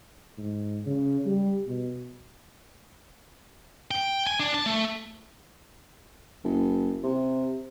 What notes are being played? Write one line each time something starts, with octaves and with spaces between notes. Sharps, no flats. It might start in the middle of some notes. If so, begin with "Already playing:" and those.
G#2
C#3
G3
B2
G5
G#5
D4
A5
A3
F#1
C3